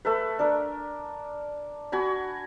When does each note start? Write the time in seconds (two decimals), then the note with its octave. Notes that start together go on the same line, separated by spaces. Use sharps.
0.05 A3 A4 B4
0.39 D4 A#4
1.92 F#4 G#5 B5